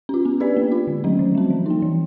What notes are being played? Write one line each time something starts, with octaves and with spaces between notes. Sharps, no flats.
C#4 F4
B3
D4 G4 B4 D5
A#3
D4 F4
D3
F#3 A3 C#4
D#3
G3 C4
F3
A#3 D#4
E3